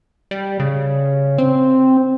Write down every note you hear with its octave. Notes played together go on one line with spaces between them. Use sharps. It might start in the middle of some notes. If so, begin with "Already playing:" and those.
G3
C#3
C4